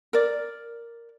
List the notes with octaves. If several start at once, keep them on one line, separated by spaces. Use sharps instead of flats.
A#4 D5